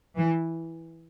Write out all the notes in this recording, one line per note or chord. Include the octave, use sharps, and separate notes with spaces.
E3